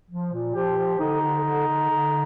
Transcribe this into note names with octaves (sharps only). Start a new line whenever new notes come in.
F3
A#2
F3 G4
F3
D3 D#4
D3
D3
D3
D3